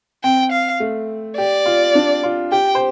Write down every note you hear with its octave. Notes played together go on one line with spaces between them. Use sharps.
C4 G5
F5
A3
G4 D5
F4
D4
F4
G4 G5
C5